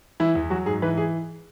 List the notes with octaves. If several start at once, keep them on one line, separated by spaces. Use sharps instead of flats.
E3 E4
E2
F#3 F#4
G#2 G#4
E3 B4
G#4